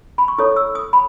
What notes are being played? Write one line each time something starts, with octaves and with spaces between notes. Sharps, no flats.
B5
C#6
E4 A4 C#5 D#6
E6
D#6
B5